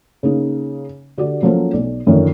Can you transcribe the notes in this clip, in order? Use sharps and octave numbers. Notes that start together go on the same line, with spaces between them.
C#3 A#3 D#4
D3 F#4 G4 D5
F3 F#3 A#3 C#4 A4 C5
B1 D5
F#2 D3 D#3 F3